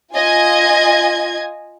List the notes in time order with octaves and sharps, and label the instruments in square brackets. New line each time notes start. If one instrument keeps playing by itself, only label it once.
[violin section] F4 D#5 G#5 G#6